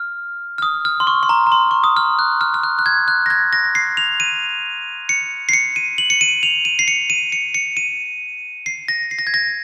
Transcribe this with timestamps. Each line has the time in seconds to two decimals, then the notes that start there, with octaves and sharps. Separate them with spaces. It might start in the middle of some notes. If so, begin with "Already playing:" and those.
Already playing: F6
0.58 F6
0.62 D#6
0.85 F6
1.00 C6
1.07 C#6
1.23 C6
1.29 A#5
1.47 A#5
1.52 C6
1.71 C#6
1.84 D#6
1.97 F6
2.19 F#6
2.41 F6
2.54 F6
2.63 F#6
2.79 F#6
2.86 G#6
3.08 F#6
3.26 A#6
3.30 G#6
3.53 A#6
3.75 C7
3.97 F7
4.20 D#7
5.09 C#7
5.49 C7
5.53 C#7
5.76 D#7
5.98 F#7
6.10 C#7
6.21 D#7
6.43 F7
6.65 D#7
6.79 C7
6.88 C#7
7.10 D#7
7.32 C#7
7.55 C#7
7.77 D#7
8.66 C7
8.88 A#6
9.11 C7
9.19 A#6
9.27 G#6
9.34 A#6